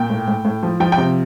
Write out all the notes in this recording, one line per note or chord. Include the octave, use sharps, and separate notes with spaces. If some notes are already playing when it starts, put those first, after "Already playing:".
Already playing: A#2 G5
A2
A2
A2
F3
F3 G5
G5
C3